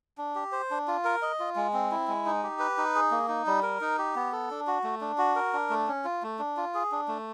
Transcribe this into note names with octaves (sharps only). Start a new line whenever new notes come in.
D4
G4
C5
D4
F4
A#4
D#5
F4
G#3
C4
E4
G#3
D#4
G4
B4
D#4
G#4
A#3
D#4
G3
A#4
D#4
G4
B3
A4
D4
F#4
A3
D4
F#4
A#4
D4
A3
C#4
F4
A3
D4
F4
G#4
D4
A3